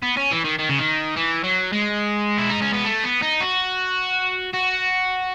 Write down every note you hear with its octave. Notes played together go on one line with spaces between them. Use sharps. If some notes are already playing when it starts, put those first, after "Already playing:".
B3
C#4
E3
D#3
D#3
C#3
D#3
E3
F#3
G#3
E4
D#4
C#4
B3
A3
B3
D#4
F#4
F#4